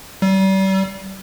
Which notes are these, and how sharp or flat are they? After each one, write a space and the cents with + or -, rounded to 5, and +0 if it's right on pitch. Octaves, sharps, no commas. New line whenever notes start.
G3 -35